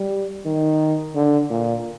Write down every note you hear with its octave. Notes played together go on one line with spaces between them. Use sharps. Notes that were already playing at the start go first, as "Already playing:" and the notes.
Already playing: G3
D#3
D3
A#2